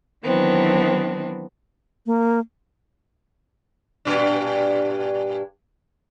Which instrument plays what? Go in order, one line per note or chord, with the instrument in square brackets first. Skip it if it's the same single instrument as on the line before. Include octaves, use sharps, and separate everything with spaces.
[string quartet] D#3 E3 F#3 B3 C4 D4
[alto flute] A#3
[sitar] G2 A#2 D4